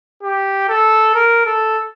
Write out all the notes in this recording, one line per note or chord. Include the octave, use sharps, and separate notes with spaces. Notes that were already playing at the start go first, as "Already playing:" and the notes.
G4
A4
A#4
A4